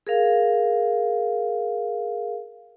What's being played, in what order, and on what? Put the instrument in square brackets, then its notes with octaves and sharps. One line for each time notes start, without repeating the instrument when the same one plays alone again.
[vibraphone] G#4 A#4 F5